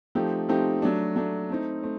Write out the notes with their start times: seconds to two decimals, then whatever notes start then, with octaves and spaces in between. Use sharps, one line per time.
0.15 F3 A3 C4 D#4 G4
0.49 F3 A3 C4 D#4 G4
0.82 F#3 A3 D4
1.16 F#3 A3 D4
1.50 A3 C4 D#4
1.83 A3 C4